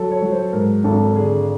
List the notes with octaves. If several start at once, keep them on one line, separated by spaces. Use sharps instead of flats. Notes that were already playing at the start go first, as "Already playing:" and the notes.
Already playing: F#3 A4
C#5
F#3
C5
G#2 A#4
G#1 A4
D3 G#4